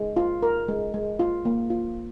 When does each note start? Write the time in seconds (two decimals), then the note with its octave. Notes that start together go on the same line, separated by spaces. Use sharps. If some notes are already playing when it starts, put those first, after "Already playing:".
Already playing: G#3
0.16 F4
0.43 A#4
0.68 G#3
0.94 G#3
1.19 F4
1.45 A#3
1.70 F4